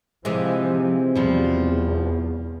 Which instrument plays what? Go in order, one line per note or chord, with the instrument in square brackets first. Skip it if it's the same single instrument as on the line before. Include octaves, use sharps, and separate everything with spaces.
[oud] C3 E3 G#3 [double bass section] F3
[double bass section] E2 [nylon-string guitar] B2 F3 G3